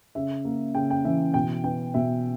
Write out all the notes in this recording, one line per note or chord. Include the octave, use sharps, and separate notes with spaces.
C#3 E5
A#3
C#3 G5
G5
E3 E5
B2 G5
B3 G5
B2 E5